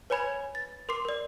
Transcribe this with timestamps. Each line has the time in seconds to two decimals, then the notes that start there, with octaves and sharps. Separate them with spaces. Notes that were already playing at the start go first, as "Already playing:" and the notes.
0.10 B4 C#5 G#5 B5 G#6 F7
0.55 A6
0.89 A#4 C6 D6 C7
1.05 A#4 D5